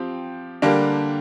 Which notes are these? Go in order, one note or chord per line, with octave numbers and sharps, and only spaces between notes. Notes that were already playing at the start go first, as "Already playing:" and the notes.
Already playing: F3 C4 G4
D3 G3 A#3 D4 G4